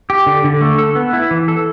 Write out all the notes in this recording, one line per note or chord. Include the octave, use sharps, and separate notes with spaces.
G4
D3
D3
A3
A4
B3
E4
E3
A4